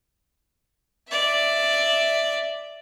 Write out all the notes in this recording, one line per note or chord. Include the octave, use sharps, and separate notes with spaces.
D5 E5